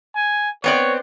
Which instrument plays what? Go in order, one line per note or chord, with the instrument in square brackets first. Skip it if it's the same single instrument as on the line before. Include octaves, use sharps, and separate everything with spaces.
[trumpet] G#5
[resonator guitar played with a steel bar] B3 C4 D5 [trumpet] C#5